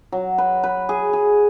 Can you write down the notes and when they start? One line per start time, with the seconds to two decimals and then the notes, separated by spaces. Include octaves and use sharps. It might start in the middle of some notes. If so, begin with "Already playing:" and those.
0.12 F#3
0.38 B4
0.64 B4
0.89 G#4
1.13 G#4